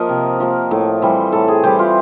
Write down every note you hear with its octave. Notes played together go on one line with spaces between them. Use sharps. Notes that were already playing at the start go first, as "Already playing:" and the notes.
Already playing: F3 A#3 A#4 D#5
C3
F3 A#3
A2
E3 G3 C4
A2 A4
G#4
E3 G3 C4 G4
F4